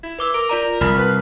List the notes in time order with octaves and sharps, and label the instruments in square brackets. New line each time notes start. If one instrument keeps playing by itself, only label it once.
[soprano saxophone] E4
[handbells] B4 D6 E6
[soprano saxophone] A#4 [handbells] D7
[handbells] F4 D5 A#5
[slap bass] C2 [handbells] A#4 [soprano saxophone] B5 [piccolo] F6
[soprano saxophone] B4